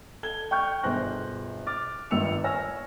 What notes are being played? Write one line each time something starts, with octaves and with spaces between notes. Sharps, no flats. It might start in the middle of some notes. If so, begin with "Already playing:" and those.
A4 G#6 G7
G5 C#6 F6 G6
G1 B2 G#4 C5 F#6 A#6
D6 F6 A6
G1 G2 D#3 E6 C#7 F7
C#5 G#5 E6 F6 A#6